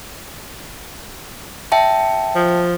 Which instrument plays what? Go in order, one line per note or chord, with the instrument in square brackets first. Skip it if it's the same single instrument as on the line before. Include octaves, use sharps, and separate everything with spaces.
[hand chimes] E5 G5 A5
[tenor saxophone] F3